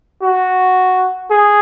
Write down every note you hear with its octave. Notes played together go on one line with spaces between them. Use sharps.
F#4
G#4